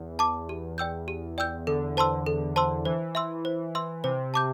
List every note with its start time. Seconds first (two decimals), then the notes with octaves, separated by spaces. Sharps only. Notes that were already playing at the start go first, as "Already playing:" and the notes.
Already playing: E2
0.19 A5 D6
0.49 G4
0.78 D5 G5 E6 G6
1.08 G4
1.38 D5 G5 E6 G6
1.67 D3 A4
1.97 C5 A5 C6 E6
2.26 A4
2.56 C5 A5 C6 E6
2.85 E3 C5
3.15 E5 C6 E6
3.45 C5
3.75 E5 C6 E6
4.04 C3 C5
4.34 A5 D6 G6